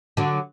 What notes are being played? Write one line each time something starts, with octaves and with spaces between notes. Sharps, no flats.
D3 F#3